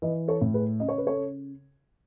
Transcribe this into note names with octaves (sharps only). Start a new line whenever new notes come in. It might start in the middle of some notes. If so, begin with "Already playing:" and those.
E3 B4 D#5
A4 C#5
A2
G#4 B4
C#3 D#5
C#5
B4
A4 C#5